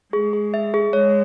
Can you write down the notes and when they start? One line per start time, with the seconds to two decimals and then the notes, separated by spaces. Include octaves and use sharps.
0.13 G#3 G#4
0.33 G#4
0.54 E5
0.74 G#4
0.93 G#3 C#5